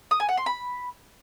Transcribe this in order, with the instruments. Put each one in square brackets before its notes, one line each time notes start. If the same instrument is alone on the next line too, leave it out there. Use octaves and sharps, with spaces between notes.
[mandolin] D#6
G#5
F#5
C6
B5